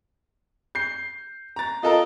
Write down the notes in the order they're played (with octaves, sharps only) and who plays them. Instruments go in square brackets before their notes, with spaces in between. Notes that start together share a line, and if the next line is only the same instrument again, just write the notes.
[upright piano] G6 C7
A#5 A6
[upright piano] F4 A4 A#4 [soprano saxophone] D#5